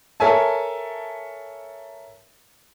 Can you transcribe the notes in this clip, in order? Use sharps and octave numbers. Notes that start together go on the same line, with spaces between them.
A4 A#4 C#5 E5 G#5 A5